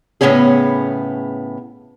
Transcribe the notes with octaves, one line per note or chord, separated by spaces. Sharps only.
A2 C#3 B3 C#4 G#4